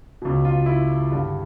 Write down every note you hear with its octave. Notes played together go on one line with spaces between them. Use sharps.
C#2 B2
F4
E4
G2 D3